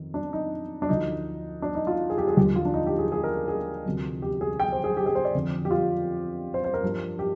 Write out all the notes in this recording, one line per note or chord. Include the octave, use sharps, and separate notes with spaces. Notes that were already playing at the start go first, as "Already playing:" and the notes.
Already playing: F2 D#3
D4
D#4
D4
D2 D3 F3 D#4
D4
D#4
F4
G#4
G4
G#4
D#2 D3 F3 G4
F4
D4
D#4
G4
G#4
G#4
A#4
G#4
D2 C3 F3
G4
G#4
G5
C5
G#4
G4
G#4
C5
D5
F2 D3 F3
G4
F4
C5
C5
A#4
G2 F3
G4